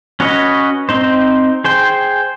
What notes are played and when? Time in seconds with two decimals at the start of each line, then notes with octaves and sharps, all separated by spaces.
0.20 C#4 F#4 B4 C#5 D#5
0.89 C4 D#4 C5
1.64 G#4 C5 G5